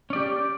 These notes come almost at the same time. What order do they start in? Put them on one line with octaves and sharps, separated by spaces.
C#4 D5 G4